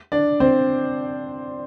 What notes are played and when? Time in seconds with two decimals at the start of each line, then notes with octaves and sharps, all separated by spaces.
0.12 D4 D5
0.40 C4 C5